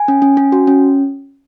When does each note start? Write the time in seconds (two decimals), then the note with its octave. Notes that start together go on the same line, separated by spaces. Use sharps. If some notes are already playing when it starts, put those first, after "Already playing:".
Already playing: G#5
0.08 C#4
0.22 C#4
0.37 C#4
0.52 F#4
0.67 C#4